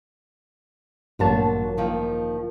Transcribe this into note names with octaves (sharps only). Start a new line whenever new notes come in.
A1 G2 A#2 F#3 A#3 A5
D#3 F3 A#3